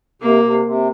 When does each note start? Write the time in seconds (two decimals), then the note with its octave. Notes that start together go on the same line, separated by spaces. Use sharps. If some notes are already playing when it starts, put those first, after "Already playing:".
0.22 C3 A#3
0.43 C3
0.65 C3